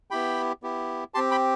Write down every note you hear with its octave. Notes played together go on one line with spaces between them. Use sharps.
B3 E4 G4 G5 B5
B3 E4 G4
C4 G4 A5 C6
G5 B5